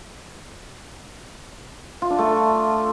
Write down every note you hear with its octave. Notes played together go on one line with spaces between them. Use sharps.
F4
D4
A3